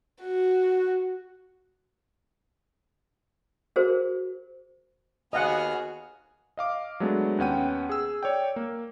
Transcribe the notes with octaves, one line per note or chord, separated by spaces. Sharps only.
F#4
F#4 G#4 A#4 C5
D#2 B3 F#4 G#4 D#5 F5 F#5 F6
D#5 F5 D6
F#3 G#3 A3 B3 D4
D#2 B3 C#4 F#5 G5 D#7
G#4 E6
C#5 D5 G5
A#3